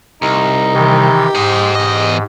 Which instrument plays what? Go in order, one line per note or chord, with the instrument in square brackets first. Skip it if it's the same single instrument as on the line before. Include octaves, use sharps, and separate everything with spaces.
[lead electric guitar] C2 [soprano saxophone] D#4
[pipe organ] C3 D#3 E3 [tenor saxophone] G4
[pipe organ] G#2 [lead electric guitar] C5 D#5
[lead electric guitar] E2 D#5